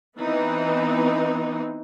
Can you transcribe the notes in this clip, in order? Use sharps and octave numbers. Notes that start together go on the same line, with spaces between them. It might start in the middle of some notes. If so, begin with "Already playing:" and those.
E3 B3 C4 D#4